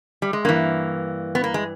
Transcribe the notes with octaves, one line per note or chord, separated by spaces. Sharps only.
G3
G#3
G2 E3 A#3
B3
A#3
G#3